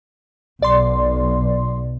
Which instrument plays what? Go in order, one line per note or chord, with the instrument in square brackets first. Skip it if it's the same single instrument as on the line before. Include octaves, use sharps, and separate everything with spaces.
[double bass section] B1 [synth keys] D5 C6